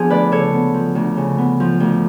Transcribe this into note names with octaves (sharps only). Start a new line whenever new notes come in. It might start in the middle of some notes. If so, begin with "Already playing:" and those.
Already playing: F3 B3 D4 G#4
D2 B4 D5
C#3 A4 C#5
B3
F3
D2
C#3
B3
F3
D2